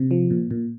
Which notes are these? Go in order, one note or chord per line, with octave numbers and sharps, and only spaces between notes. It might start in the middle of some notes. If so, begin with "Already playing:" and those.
Already playing: C3
F3
A#2
A#2